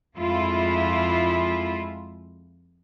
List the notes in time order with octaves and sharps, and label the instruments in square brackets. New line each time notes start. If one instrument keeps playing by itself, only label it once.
[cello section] F2 F3 G#3 E4 F4